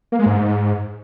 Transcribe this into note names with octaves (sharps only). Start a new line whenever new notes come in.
A#3
G#3
G#2